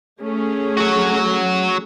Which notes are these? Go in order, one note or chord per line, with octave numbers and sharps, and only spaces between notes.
A3 C#4 G#4
F#3 F#4